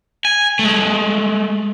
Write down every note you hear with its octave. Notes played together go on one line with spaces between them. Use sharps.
G#5
G#3 A3